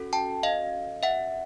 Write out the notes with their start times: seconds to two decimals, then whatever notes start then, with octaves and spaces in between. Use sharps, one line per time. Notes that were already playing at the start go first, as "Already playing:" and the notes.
Already playing: C#4 F#4 A4
0.13 G5 A5
0.43 D#5 F5
1.03 E5 F#5